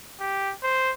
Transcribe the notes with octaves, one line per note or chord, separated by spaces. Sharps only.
G4
C5